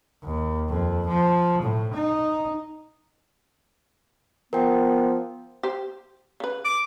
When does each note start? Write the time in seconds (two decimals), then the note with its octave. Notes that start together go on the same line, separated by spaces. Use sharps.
0.24 D#2
0.69 F2
1.08 F3
1.63 A2
1.94 D#4
4.53 F3 B3 A#4 G5
5.63 G4 C5
6.40 C#3 B4
6.65 D6